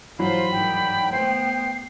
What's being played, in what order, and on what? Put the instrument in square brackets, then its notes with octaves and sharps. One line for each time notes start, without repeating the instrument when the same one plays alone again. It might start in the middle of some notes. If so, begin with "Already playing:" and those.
[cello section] G#2 F4 C5 [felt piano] E3 F#3 [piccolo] B5
[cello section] G#2 D#3 G3 [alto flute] G5
[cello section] A3 B3 [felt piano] C5 [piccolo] C7